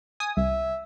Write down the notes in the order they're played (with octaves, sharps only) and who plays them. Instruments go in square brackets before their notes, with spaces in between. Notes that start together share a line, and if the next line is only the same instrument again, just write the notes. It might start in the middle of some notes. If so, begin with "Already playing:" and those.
[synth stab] G#5 D#6
[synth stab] C2 [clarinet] E5